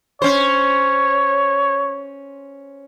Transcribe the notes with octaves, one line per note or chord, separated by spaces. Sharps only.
C#4 C5 C#5